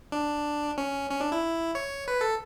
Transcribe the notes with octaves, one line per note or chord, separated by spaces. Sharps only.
D4
C#4
C#4
D4
E4
C#5
B4
A4